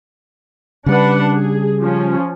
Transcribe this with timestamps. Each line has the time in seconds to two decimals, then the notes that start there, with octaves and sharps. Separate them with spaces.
0.86 C#3 G3 D4 B4 F#5
1.35 G#4
1.80 F3 C#4